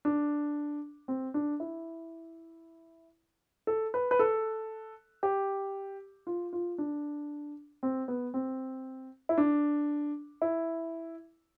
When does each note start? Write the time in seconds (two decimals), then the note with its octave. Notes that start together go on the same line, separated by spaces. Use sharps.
0.05 D4
1.08 C4
1.34 D4
1.60 E4
3.67 A4
3.94 B4
4.11 B4
4.19 A4
5.23 G4
6.27 F4
6.53 F4
6.78 D4
7.83 C4
8.08 B3
8.34 C4
9.29 E4
9.38 D4
10.42 E4